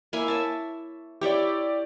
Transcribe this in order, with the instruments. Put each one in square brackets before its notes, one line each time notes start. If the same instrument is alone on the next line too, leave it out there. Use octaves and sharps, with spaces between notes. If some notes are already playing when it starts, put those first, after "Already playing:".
[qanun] A#3 E4 G#5
C#5 E5 A5
[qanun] E4 C#5 G5 [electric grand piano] G4 D5